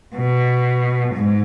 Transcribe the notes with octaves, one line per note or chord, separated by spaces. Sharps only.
B2
G#2